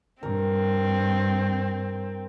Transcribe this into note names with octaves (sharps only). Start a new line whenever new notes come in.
G2 C4 A#4